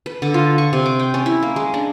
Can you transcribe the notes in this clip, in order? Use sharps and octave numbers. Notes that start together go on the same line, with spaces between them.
B4
D3
F4
C#6
C3
D6
G5
C#4
E4
A#3
G#3
D4